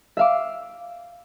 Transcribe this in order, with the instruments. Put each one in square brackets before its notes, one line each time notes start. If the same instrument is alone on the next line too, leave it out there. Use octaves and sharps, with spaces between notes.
[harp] E5 F5 D6